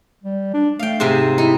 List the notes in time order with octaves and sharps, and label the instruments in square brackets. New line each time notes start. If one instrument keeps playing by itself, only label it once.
[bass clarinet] G3
D4
[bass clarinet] A3 [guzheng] F5 G5
[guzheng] G#2 C3 C4
[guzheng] D#4 [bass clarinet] E4